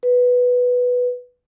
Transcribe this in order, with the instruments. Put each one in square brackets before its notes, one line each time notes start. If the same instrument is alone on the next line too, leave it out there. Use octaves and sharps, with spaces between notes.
[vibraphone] B4